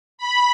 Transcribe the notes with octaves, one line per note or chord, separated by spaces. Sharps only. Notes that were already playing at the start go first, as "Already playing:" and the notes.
B5